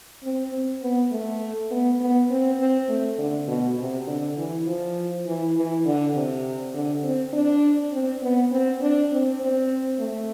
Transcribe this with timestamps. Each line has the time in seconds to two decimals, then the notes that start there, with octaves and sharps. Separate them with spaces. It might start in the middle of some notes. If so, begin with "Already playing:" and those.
0.23 C4
0.52 C4
0.82 B3
1.11 A3
1.71 B3
2.01 B3
2.30 C4
2.59 C4
2.89 A3
3.18 D3
3.48 B2
3.78 C3
4.07 D3
4.37 E3
4.66 F3
5.26 E3
5.56 E3
5.85 D3
6.15 C3
6.74 D3
7.03 C4
7.33 D4
7.92 C4
8.22 B3
8.51 C4
8.81 D4
9.11 C4
9.40 C4
10.00 A3